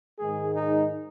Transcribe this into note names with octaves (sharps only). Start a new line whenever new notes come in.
G#2 D#3 G#3 G#4
D#4